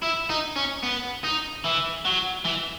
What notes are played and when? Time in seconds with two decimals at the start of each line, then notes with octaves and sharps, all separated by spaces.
0.02 E4
0.29 D#4
0.56 C#4
0.83 B3
1.24 D#4
1.64 E3
2.05 F#3
2.45 E3